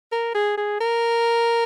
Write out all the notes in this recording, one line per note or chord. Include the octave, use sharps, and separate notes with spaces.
A#4
G#4
G#4
A#4